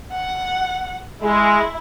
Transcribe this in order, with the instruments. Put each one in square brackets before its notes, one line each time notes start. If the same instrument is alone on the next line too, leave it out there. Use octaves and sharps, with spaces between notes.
[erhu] F#5
[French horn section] G#3 [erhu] E4